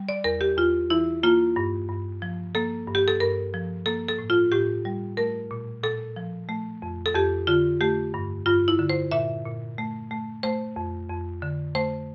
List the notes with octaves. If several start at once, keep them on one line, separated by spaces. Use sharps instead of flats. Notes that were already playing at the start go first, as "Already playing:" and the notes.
Already playing: G3
D5
E2 A#4
G4
E2 F4
E3 E4
A#3 F4
G2
G2
F3
A#3 A4
G2
G4
A4
G2 A#4
F3
A#3 A4
A4
A2
F4
A2 G4
G3
A3 A#4
A#2
A#2 A4
F3
A3
F2
A4
F2 G4
D3 F4
A3 G4
G2
G2 F4
E4
D3
C5
A#2 E5
A#2
A3
A3
A3 C5
F2
F2
D3
A3 C5